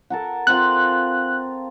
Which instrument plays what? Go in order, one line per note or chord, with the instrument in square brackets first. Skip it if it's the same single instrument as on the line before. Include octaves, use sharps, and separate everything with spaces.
[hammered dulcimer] A4 A#4 F#5
[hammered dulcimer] C4 F4 F5 [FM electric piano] F#6